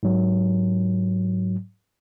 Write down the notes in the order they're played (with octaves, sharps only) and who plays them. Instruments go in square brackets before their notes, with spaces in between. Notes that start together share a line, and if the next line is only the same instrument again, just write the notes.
[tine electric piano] G#2 F#3